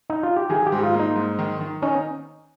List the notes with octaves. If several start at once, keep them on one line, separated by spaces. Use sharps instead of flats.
D#4
F4
G4
D#3 G#4
G4
G#2
F4
A#3
D#4
G#2
D#3
D#3
C#4 D#4